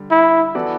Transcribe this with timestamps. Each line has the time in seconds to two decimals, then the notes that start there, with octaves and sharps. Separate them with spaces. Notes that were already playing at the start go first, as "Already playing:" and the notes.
Already playing: D3 G3
0.11 E4
0.55 E3 B3 F#4 A4 D5